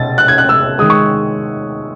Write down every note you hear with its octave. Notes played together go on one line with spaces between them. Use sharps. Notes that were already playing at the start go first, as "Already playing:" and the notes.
Already playing: B2 A6
F#6
G#6
F#6
E6
D#3 G#3 D#6
C#6